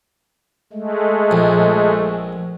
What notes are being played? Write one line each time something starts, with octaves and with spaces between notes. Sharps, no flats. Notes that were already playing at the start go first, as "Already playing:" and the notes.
G#3 A3
A#1